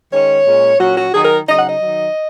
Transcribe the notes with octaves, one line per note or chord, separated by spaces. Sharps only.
D#3 G#3 C#4 C#5
A#2 G#3 C#4
A#2 F#3 C#4 F#4
F#4
D#3 F#3 D#4 G#4
A#4
C#3 F#3 D#4 D#5
F#5
D#5
D#3 F#3 D#4